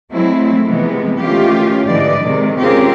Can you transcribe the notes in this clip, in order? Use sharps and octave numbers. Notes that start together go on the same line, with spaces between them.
F#3 G#3 A3 C4 E4
C3 E3 F3 G#3 B3
D#3 E3 A3 C#4 F4 G4
G#2 D3 E3 D5 D#5
C3 D#3 G#3
C4 C#4 F4 G4 G#4 A#4